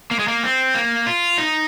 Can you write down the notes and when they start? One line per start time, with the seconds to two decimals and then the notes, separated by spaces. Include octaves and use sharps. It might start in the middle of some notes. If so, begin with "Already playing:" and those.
0.11 A#3
0.19 G#3
0.28 A#3
0.44 C4
0.74 A#3
1.07 F4
1.38 D#4